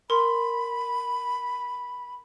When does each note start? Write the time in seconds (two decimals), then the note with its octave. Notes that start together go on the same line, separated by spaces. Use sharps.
0.10 A#4 B5 C6